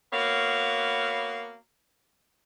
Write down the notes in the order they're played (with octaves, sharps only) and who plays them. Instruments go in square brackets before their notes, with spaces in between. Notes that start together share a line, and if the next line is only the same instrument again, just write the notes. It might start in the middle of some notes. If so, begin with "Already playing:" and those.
[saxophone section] A#3 B3 F#4 C#5 F5